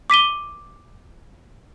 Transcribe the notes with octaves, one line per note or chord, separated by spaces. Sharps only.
D6 B6 D#7 G7